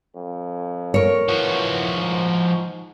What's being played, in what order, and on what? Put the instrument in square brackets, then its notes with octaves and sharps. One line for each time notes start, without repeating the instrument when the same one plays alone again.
[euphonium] F2
[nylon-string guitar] A#4 C#5
[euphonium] E3 [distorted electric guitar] F3 F#4
[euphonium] G#2